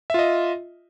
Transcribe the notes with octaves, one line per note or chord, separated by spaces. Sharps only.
F4 D#5 E5